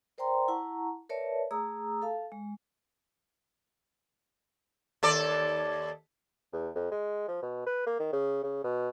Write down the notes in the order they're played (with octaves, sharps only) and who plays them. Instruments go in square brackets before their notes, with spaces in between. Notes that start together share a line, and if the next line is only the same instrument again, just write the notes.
[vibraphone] A#4 C5 D5 G5 A#5 C6
E4 F#5 A5 A#5 C#6
A#4 B4 C#5 D5 E5 A5
A3 G#4 A#5 D#6 E6
A4 F5 A5
G#3
[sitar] D#2 A4 D5
[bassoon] E2
F2
G#3
F3
B2
B4
A#3
D#3
C#3
C#3
B2